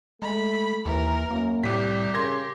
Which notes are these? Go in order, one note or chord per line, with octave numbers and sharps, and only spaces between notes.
G#3 A3 B5
D#2 E3 A#4
F#2 A#3
C2 A2 G3 G4 B6
C#3 A#4 C6 G#6 A#6